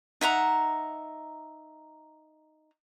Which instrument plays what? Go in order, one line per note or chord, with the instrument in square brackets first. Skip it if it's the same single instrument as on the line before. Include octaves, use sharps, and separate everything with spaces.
[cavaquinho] D#4 E5 F#5 A#5